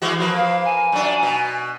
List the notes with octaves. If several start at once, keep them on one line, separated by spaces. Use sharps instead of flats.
E3 G#3 F#4
F3 A#3 B4
F5
G#5
F#2 D4
B2